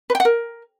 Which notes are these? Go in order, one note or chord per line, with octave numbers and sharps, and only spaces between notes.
B4
G5
F#5
A#4